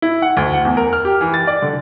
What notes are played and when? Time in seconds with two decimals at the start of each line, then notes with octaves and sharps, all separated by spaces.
0.02 E4
0.22 F#5
0.37 D2
0.53 F#5
0.65 E2
0.77 A#4
0.93 F6
1.05 G4
1.21 E3
1.34 A6
1.47 D5
1.62 D3